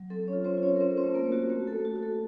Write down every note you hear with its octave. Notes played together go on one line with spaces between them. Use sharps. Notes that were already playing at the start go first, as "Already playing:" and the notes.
Already playing: F#3
C4 A4
C#4 C#5
F4
C4 C5
F4
C#4 C#5
A#4
C4 C#4 C5
C4 C5
A3
A#3 A#4
A3
F#4
A3 F#4
A4
A3
F#4
F#4
A4